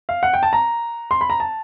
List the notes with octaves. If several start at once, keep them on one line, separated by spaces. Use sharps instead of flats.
F5
F#5
G5
A5
A#5
C6
B5
A#5
A5